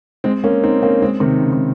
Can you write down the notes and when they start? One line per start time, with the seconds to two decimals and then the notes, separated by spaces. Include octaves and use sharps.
0.24 G#3 C4
0.44 A#3 C#4
0.63 C4 D#4
0.82 A#3 C#4
1.02 G#3 C4
1.20 C3 D#3
1.40 C#3
1.53 C3